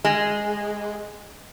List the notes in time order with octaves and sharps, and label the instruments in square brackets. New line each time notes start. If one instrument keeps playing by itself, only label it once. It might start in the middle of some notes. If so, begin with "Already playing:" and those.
[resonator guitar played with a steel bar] G#3